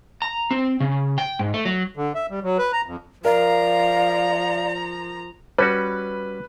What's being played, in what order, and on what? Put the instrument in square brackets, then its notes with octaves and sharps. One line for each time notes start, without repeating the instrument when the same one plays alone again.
[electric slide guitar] A#5
C4
C#3
G5
G#2
A3
F#3
[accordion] D3
E5
G3
F#3
B4
A#5
F2
[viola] F3 A#5 [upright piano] A#4 [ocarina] D5 [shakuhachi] F5
[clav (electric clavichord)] G3 C#4 F#4 [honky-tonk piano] B4